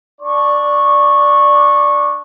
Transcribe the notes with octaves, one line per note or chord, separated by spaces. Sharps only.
D4 D5 C#6